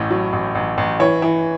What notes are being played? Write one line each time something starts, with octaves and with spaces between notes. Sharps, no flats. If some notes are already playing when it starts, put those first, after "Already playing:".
Already playing: A1 A2
F#3
A1
A1
A1
E3 C#5
E3